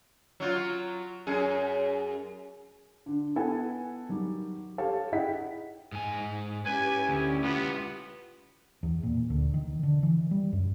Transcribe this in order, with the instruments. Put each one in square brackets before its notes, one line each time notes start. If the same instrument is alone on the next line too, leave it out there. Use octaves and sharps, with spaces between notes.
[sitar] F#3 F4
F#2 G#4
[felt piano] D3
B3 E4 A4 F#5 G#5
D#3 F#3 G3
G4 A4 C#5 F5
E4 G#4 D#5 F#5 G5 B6
[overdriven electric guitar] G#2 G#5
[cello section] C#4 E4 G4 [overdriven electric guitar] B4 [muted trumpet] G#5
[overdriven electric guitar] D2
[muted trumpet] B3 [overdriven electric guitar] F4 B4
[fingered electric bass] E2
A#2
D2
D#3
D3
E3
G3
F#2